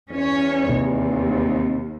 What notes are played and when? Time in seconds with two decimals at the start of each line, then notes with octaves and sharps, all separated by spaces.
0.11 E2 C#4 C#5
0.69 D#2 C3